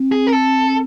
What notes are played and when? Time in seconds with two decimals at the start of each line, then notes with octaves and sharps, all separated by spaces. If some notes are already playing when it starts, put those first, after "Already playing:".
Already playing: C4
0.12 G#4
0.27 A#4
0.33 A4